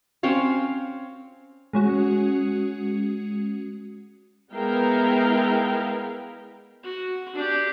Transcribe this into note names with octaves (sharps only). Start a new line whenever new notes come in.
C4 C#4 C#5 F5
G#3 C#4 F#4
G#3 B3 E4 A#4 F5 G5
F#4
D4 G4